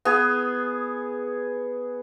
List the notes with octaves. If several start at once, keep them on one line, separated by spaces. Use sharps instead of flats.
B3 G#4